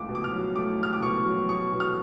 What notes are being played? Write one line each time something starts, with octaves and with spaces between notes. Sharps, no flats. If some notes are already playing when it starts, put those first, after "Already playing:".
Already playing: C#2 A3 D6
B2
D6
F6
F#3
A3 D6
C#2 F6
D6
B2 C#6
F#3
B2 C#6
B2
F6